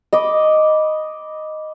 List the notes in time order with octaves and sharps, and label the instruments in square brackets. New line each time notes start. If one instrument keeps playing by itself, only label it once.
[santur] D#5 B5 D6